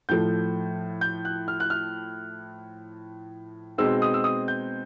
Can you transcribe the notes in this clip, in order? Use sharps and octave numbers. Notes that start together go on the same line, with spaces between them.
A2 F3 A3 G6
G6
F#6
F6
F#6
F6
B2 G#3 C4 D#4 E6
D#6
E6
D#6
G6